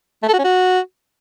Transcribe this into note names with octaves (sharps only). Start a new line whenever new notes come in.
A3
A4
F#4
C#4
F#4